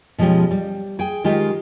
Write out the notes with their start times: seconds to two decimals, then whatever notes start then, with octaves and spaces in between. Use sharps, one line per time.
0.18 B2 F3 G#3 C#4 G4
0.51 G3
0.99 G#4 G5
1.24 D#3 G#3 F4 G4